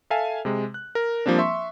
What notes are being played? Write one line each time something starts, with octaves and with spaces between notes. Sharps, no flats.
A4 E5 F5 G#5 A5
C3 G#3
F#6
A#4
F3 G3 A#3 C4 D4
E5 C6 C#6